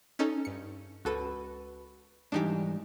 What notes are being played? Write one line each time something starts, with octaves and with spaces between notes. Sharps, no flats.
C#4 D#4 A4
G2 C#7
C#2 F#4 A4 B4 D#7
G#2 E3 G3 D4 D#4 G4